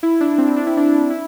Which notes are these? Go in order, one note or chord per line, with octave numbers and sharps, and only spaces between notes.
E4
D4
C4
D4
E4
D4
E4